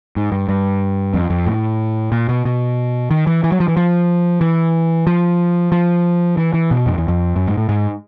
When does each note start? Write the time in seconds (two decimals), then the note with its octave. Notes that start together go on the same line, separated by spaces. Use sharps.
0.16 G#2
0.32 G2
0.48 G2
1.14 F2
1.30 F2
1.46 A2
2.12 A#2
2.29 B2
2.45 B2
3.11 D#3
3.27 E3
3.44 E3
3.52 F#3
3.60 F3
3.68 E3
3.77 F3
4.41 E3
5.07 F3
5.72 F3
6.37 E3
6.54 E3
6.71 B2
6.86 F2
6.98 E2
7.08 F2
7.36 F#2
7.47 G#2
7.57 A2
7.69 G#2